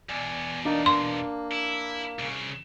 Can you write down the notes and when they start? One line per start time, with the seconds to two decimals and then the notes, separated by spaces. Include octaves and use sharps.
0.09 E2 B2 D5 G#5
0.65 A#3 D4 D#4 D5
0.86 A#3 C6
1.51 E4
2.19 C2 C#3